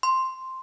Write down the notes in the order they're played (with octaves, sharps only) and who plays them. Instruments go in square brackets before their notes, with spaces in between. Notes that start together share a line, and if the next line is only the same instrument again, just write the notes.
[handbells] C6